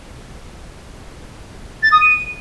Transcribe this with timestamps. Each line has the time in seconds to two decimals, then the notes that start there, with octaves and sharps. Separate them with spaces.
1.82 A6
1.91 D#6
2.00 D#7